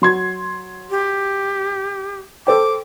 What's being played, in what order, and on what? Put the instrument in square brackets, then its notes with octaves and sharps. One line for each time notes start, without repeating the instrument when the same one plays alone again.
[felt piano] F#3 C6 G#6
[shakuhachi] G4
[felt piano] A4 C5 G5 [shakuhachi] D6